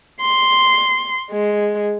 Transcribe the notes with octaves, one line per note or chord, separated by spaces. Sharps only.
C6
G#3